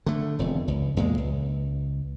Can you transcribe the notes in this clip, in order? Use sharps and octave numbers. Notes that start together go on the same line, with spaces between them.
D3 A3
E1 F2
C#2
E2 A#2 G#3
C#2